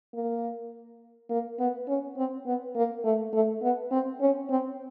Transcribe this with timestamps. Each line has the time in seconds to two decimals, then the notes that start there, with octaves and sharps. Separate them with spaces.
0.14 A#3
1.30 A#3
1.59 B3
1.88 C#4
2.17 C4
2.46 B3
2.75 A#3
3.04 A3
3.33 A3
3.62 B3
3.91 C4
4.21 C#4
4.49 C4